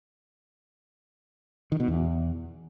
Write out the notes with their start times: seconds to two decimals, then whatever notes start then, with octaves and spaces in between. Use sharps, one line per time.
1.72 D#3
1.80 B2
1.88 E2